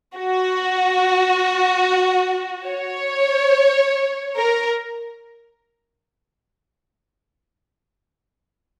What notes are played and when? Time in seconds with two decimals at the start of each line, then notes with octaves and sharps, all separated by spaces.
0.15 F#4
2.68 C#5
4.36 A#4